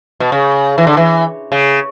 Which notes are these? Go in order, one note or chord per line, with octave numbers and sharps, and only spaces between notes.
B2
C#3
E3
D3
E3
C#3